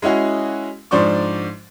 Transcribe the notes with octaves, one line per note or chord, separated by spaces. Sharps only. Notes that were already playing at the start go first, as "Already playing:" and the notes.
G#3 C#4 E4 F#4 G#4
G#2 F3 D4 C5 D5 C#6